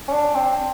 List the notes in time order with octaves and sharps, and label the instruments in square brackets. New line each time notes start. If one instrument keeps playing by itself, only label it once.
[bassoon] C#4
D4
C4